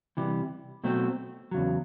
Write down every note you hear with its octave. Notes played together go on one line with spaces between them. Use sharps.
C3 E3 G3
B2 F#3 A3 C4
E2 C#3 F#3